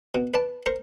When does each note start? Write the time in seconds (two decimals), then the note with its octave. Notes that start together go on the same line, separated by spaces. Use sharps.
0.15 B2
0.34 B4 D5 A5
0.66 A#4 C5 C#6